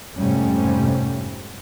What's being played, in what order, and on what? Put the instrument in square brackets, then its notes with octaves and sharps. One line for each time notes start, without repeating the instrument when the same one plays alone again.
[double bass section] F2 G#2 C3 G3 A3 C#4